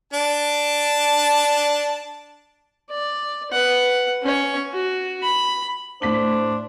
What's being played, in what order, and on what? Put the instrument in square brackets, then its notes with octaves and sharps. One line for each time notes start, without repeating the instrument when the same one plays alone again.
[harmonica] D4 A5
[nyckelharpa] D5
B4 F#5
C#4 C#5
F#4
B5
[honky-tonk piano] A2 B6 F#7 [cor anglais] D4 [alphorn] C5